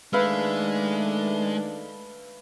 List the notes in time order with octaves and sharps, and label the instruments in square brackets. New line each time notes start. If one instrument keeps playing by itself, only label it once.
[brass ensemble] D#3 A3 D4 [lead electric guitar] G#3 [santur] B4 E5 F5